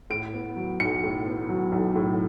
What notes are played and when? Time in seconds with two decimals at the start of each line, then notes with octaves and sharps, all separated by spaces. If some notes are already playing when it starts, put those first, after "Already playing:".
0.10 A2 D7
0.33 B3
0.56 F#3
0.80 B1 C#7
1.04 A2
1.26 B3
1.49 F#3
1.72 B1
1.96 A2